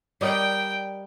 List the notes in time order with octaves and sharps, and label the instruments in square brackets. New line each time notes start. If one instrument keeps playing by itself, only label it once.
[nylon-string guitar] G3 [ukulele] A#4 D5 D#5 [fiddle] G5